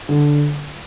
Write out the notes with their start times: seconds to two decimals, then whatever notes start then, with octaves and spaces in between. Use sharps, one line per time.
0.09 D3